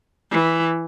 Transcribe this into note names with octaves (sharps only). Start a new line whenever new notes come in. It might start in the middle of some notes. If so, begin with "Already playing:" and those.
E3